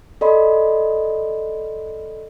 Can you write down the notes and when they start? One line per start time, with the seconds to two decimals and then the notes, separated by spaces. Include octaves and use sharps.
0.21 A4 D5 D#5 B5 C6